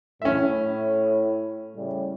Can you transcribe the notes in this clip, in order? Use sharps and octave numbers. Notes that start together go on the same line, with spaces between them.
A2 C#4 E5
A2 C#3 G3